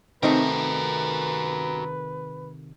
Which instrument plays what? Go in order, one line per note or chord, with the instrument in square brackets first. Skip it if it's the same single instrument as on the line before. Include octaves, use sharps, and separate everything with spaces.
[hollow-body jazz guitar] C3 D#3 A3 [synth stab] C4 D#4 [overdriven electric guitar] F#4 A#4 [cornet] B4